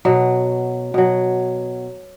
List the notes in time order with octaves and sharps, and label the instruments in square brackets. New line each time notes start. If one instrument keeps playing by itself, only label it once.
[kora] B2 F#3
B2 F#3